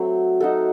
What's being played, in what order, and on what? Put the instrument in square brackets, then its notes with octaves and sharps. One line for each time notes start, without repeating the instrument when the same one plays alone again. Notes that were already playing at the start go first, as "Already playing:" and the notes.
Already playing: [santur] F#3 A3 C4
D#4 F#4 A4